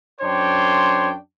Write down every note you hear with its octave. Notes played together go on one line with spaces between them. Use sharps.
F#2 D4 C5 C#5 G5 C6